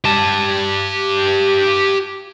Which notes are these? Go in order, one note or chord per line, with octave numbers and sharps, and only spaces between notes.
G4 A5